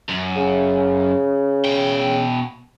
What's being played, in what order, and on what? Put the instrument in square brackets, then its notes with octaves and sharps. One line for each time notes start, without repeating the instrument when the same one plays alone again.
[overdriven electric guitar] F#2
[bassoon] C#3
[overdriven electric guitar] B2 G5